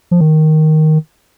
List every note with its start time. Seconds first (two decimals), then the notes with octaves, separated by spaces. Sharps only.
0.11 F3
0.20 D#3